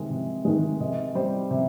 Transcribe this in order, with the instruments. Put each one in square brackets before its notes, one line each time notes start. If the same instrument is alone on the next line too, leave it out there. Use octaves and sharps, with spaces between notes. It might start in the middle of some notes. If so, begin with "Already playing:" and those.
Already playing: [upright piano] C3 D#3 G#3
C3
D#3 G#3
C3 D#5
G3 C5
C3